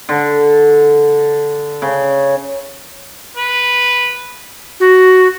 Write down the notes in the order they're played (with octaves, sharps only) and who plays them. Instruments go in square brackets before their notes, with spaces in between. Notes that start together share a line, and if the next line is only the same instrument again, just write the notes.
[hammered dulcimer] D3
C#3
[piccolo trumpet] B4
[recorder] F#4